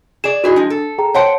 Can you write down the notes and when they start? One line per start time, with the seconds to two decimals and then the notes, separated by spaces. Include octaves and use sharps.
0.24 G#4 D5 E7
0.44 D#4 E4 F#4 G#4 B4
0.56 F3 G#3 D4
0.70 A4
0.98 G#4 G5 A#5
1.14 C5 C#5 F#5 G5 A5 C6